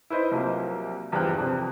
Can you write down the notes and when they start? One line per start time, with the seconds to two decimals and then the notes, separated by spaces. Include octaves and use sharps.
0.10 E4 B4 C5 D#5
0.31 C2 F3 F#3 A#3
1.12 E2 G2 F3 C5 G5 F#6
1.38 F2 C3